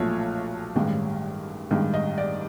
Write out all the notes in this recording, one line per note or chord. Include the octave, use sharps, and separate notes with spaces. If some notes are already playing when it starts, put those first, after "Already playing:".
Already playing: B1 A#2 F3 A3 C#5
A1 G2 D#3 G#3
A1 G2 D#3 G#3
D#5
D5